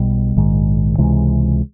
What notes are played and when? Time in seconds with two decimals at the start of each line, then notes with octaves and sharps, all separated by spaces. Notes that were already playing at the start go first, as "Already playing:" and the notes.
Already playing: B1 B2 G3
0.36 A#1 G#2 D#3 G#3
0.98 C#2 C3 E3 G#3